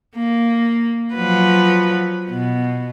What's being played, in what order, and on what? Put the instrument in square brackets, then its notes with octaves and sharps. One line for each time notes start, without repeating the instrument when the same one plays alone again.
[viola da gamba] A#3
F3 F#3 B4
B2